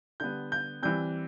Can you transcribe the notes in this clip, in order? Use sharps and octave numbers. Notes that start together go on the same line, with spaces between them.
D3 G3 B3 G6
G6
E3 G3 C4 G6